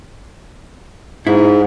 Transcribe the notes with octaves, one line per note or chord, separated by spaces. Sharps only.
G#2 E4